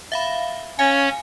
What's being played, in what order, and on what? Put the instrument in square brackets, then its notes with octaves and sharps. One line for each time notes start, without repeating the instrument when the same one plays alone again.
[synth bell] E5 F5 B5
[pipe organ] C#4 C#5 [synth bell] F5 G#5